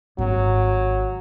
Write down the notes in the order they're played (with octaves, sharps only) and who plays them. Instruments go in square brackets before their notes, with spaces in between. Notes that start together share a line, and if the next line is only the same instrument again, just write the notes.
[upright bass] G#1 [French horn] F#3